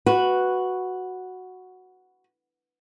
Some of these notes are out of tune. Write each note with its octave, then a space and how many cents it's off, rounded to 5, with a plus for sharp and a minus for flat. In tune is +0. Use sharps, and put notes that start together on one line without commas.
F#4 +0 B4 +0